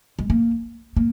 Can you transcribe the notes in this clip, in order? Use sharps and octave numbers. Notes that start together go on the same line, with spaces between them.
G#3
A#3
A#3